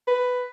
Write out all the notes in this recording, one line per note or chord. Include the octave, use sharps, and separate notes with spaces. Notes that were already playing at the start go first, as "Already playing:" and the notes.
B4